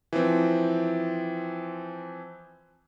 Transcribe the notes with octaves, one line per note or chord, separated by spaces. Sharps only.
E3 F3 C4